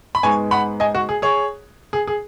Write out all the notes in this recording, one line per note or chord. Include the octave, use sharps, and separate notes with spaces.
B5
G#2 G#3 B3 G#5 C#6
F#5 B5
D#5 G#5
F#4
G#4
G#4 C#5
G#4
G#4